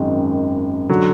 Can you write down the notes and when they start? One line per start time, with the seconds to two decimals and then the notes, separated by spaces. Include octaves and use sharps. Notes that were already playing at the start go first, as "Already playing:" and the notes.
Already playing: G#1 F#2 D#3 G#3
0.89 D3 F#3